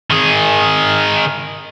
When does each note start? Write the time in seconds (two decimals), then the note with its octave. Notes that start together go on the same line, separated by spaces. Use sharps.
0.10 D#3 G#4